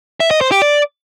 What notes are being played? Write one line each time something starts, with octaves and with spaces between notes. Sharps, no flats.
E5
D#5
C5
G4
D5